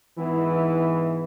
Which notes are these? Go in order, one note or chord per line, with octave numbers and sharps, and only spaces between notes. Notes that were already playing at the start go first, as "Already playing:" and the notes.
G#2 E3 B3 E4